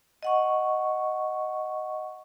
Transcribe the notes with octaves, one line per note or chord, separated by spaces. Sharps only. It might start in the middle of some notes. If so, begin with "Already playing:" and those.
D#5 F#5 C#6